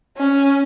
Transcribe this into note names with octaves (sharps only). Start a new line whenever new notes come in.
C#4